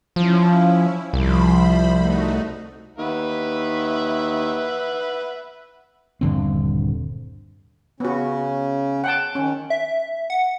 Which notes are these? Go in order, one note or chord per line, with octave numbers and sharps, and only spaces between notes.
F3 C#4 E4
C2 F3 C5 B5
A3 D#4 F#4
D#2 B4 E5 F#5
D#1 G2 D3 C4
C#3 B3 C#4 F#4
F#5 G5 A5
D#3 C#4
E5
F#5